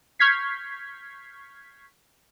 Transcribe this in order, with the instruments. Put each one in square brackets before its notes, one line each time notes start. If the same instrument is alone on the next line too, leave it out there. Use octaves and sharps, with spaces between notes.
[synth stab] C#6 F6 G6 G#6 B6 C7